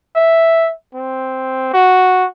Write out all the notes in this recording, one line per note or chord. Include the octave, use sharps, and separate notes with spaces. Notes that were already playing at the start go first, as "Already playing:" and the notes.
E5
C4
F#4